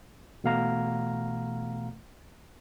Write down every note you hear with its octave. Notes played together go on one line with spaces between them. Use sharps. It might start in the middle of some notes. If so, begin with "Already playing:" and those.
B2 E3 A3 F5 F#5 A#5